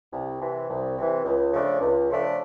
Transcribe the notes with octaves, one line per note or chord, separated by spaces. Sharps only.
C2
C3 E3
C2
C3 E3
C#2
C#3 F3 A3 D4
C#2
C#3 F3 A3 D4